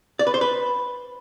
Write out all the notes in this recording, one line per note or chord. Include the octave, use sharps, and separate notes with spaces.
D5
B4
C5
B4